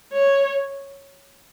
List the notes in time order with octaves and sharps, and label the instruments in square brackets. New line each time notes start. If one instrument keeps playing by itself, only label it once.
[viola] C#5